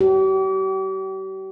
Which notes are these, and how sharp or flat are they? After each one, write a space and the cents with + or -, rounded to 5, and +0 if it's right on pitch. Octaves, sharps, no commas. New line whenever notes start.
G4 -40